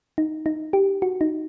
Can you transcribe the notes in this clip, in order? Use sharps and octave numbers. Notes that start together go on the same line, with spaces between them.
D#4
D#4
G4
F#4
D#4